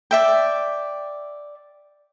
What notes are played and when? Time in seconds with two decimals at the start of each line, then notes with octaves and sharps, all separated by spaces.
0.11 D5 E5 G5